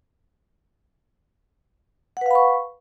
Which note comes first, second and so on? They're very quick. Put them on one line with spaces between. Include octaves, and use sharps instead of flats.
F#5 B4 F5 B5 C#6